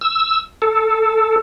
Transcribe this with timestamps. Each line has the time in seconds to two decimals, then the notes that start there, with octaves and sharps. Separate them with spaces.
0.01 E6
0.62 A4